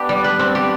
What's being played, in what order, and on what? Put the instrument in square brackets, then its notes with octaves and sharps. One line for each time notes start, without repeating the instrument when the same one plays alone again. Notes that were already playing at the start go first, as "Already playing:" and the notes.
Already playing: [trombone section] B3 D4 [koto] G4
[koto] G3
B4
C4
G4